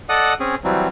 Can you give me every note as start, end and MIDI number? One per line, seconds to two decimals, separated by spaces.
0.09 0.34 69
0.09 0.34 74
0.09 0.34 75
0.09 0.34 78
0.09 0.34 87
0.40 0.55 60
0.40 0.55 61
0.40 0.55 68
0.64 0.88 52
0.64 0.88 54
0.64 0.88 55
0.64 0.88 60